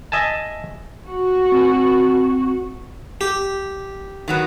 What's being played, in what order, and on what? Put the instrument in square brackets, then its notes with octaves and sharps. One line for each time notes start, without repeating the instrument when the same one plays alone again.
[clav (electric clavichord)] D#5 E5 G#5 A5
[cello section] F#4
[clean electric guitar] C4 G#5
[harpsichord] G4
[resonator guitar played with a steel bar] D#3 F#3 B3